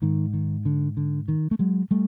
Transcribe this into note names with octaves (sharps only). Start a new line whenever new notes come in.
G#2 D#3
D#3
D3
D3
D#3
A3
F#3 G#3
G3 A3